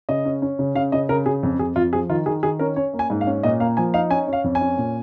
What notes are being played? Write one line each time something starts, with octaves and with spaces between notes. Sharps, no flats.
C#3 D#5
C#4
C#4
C#3
C#3 F5
C#3 D#5
C#3 A#4
C#3 G#4
F2
F2 G#4
F2 F4
F3 G#4
D#3 F4
D#3 G#4
D#3 G#4
C#4 A#4
C#4 C#5
A#3
G#5
G#2
F5
C#4
A#2 D#5
A#3 F5
F3 G#5
D#4 F5
C#4 G#5
C#4
F5
F2
G#5
C#4
A#2